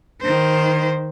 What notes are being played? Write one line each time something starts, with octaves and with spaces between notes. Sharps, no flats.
D#3 C5